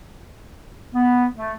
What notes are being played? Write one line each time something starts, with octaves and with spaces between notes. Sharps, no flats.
B3
A3